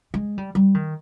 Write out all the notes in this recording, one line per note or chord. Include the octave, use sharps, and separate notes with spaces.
G#3
G3
G3
D#3